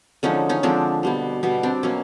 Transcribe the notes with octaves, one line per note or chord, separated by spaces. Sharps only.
D3 F3 G#3 C#4 D#4
C#4 D#4
D3 F3 G#3 C4 D4
B2 G3 B3
B2 G3 B3
C4 D4
B2 F#3 A#3 C#4